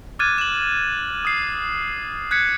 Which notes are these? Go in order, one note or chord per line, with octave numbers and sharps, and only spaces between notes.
D6 F6 F#6 G#6 A6 D#7
E7 F#7
D#6 C7
F#6 G#6 B6 C#7